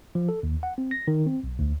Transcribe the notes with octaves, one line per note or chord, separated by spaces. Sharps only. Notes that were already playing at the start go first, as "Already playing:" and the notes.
F3
A4
D#2
F#5
C4
A#6
D#3
C4
B1
D2